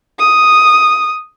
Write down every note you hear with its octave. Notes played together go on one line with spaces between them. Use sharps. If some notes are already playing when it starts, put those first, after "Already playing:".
D#6